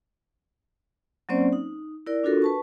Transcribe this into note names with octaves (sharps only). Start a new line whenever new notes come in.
F#3 A#3 C4 C#4 C5 D5
D#4
E4 A#4 D5
D4 F4 F#4 A4 A#4
B4 A5 C#6